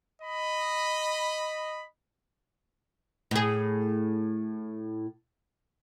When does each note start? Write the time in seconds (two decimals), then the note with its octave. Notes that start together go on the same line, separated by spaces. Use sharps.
0.22 D#5 B5
3.31 A2 G#4